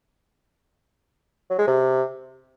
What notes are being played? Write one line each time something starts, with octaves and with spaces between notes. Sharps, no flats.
F#3
G#3
C3